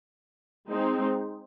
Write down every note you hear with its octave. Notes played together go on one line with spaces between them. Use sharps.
G#3 C4 D#4